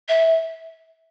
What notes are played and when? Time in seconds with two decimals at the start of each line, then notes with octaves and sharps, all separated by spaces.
0.09 E5